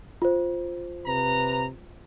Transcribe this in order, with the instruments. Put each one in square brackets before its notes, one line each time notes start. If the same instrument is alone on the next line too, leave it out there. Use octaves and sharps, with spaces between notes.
[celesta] F4 C5
[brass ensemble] C3 B4 A#5